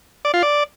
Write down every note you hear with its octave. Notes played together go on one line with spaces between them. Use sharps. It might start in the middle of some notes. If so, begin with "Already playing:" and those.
D5
F4
D5